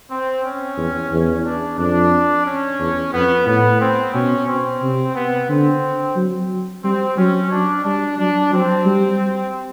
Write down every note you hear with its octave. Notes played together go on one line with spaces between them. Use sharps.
C4
C#4
E2
E2
D4
F2 D4
C#4
E2
F2 B3
A2 B3
C4
B2 C#4
C4
C3
B3
D3 C4
F#3
G3 C4
F#3 C#4
D4
G3 D4
F#3 D4
F#3 C4
G3